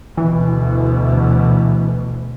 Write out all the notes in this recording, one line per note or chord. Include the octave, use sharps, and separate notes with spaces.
D2 B2 E3